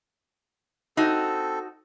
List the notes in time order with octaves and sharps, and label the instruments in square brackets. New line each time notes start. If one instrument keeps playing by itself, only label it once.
[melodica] C4 A4 [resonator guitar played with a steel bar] D#4 F#4